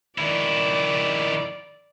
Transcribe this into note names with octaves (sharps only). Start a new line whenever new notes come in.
D#3 E4 D5